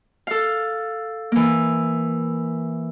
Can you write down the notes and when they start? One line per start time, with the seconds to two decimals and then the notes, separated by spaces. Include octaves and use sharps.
0.27 A4 F5
1.32 E3 A#3